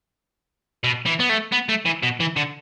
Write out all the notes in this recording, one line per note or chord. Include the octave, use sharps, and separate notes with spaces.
B2
E3
B3
A3
B3
A3
E3
B2
E3
D3